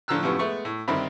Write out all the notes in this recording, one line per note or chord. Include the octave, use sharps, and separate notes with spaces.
A2 D3 F3 A#5 E6 F#6
F#2 A2 C3 F3 B3
G#3 A3 B3 C#6
A2
G2 D3 D#3 C4 E4 B5